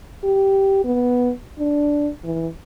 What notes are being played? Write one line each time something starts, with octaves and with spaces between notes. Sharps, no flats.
G4
B3
D4
E3